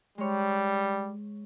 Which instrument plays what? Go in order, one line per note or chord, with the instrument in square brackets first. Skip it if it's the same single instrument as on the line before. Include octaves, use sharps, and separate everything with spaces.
[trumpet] G3 [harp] G#3 C#5